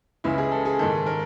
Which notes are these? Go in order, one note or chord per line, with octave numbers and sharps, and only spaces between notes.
C#2 C#3 E3 E4
G#4
A4
G#4
G#2 D#3 A4
A#4